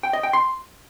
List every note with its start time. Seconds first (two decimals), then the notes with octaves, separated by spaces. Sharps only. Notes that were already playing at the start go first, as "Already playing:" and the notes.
0.03 G5
0.13 D#5
0.23 G5
0.33 C6